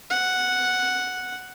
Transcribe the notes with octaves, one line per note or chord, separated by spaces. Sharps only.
F#5